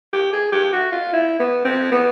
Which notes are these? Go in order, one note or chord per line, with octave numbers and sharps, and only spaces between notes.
G4
G#4
G4
F#4
F4
E4
B3
C4
B3